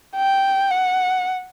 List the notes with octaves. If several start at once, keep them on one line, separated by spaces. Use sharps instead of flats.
G5
F#5